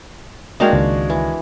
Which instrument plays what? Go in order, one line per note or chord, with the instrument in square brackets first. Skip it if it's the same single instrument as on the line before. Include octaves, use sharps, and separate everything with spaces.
[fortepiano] G#3 A#3 [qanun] D4 F#4 F5 [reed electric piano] D#5 G5
[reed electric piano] C#2 D#3
[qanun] E3